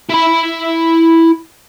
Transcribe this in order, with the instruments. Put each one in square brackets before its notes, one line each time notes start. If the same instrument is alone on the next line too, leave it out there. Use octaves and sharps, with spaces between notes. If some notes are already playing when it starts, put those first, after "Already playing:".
[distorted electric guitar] E4 B5